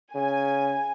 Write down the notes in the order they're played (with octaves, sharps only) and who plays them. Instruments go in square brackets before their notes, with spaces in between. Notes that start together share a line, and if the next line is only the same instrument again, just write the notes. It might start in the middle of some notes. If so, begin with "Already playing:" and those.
[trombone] C#3 [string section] G#5